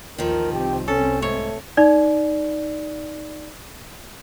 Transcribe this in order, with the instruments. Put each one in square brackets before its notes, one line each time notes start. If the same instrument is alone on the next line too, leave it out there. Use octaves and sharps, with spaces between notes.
[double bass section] A1 D#2 [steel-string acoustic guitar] D#3 F3 [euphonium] A#4
[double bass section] C2 C4 [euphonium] G4
[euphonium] C#4 [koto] A4
[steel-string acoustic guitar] G#2 [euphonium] A3 [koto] C#5
[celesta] D#4 D5